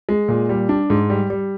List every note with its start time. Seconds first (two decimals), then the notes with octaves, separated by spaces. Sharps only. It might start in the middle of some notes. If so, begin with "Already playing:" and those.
0.09 G#3
0.28 A#2
0.49 G3
0.69 D4
0.90 G#2
1.10 G3
1.30 G3